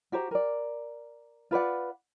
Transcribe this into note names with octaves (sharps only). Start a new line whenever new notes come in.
F#4 G4 C5 A#5
A#4 D5
F4 B4 D5 F#5